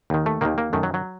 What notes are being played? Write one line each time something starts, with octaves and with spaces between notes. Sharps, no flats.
D#2 D#3
A3
D#2 D#3 A#3
A#3
F#2 D#3 A3
F#3
F#3